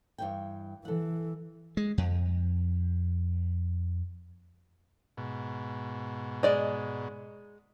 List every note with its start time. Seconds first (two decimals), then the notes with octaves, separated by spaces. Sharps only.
0.18 G2 E3 G5
0.85 E3 A4 F#5
1.77 G#3
1.98 F2
5.17 G#2 B2
6.43 G#3 D5 D#5